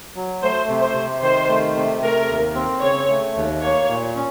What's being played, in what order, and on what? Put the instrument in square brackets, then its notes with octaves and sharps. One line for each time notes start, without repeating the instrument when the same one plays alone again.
[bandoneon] F#3
[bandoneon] A3 [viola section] C5
[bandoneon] C3
[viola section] C5
[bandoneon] C3
[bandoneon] D#3 [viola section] C5
[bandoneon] A3
C3
[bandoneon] A3 [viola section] A#4
[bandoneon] D#2
C4
[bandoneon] C#3 [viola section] C#5
[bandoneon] A3
D#2
[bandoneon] A#3 [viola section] C#5
[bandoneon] A#2
C#4